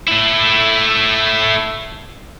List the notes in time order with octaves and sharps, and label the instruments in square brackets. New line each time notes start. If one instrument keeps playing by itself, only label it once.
[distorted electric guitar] A3 E4